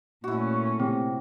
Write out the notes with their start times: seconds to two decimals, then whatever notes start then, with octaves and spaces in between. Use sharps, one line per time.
0.24 A#2 A3 C#4 E4 F#4
0.80 C3 C4